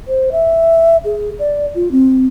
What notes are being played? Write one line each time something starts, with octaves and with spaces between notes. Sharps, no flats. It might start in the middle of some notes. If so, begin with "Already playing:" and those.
C5
E5
G#4
D5
F4
C4